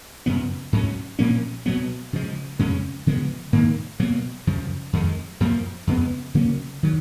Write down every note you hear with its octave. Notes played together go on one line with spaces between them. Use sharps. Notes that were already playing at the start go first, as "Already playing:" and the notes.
F#2 C#3 F3 B3
G#2 F#3 C#4
A#2 F3 A#3 C#4
B2 F#3 B3
C#3 F3 G#3
F2 C#3 G#3 C#4
C#3 F3 G#3 B3
G#2 D#3 A#3
B2 F#3 A#3
F#2 C#3 F3
F2 D#3 G#3
F#2 F3 A#3
F2 C#3 G#3 B3
C#3 F#3 A#3 C#4
D#3 F#3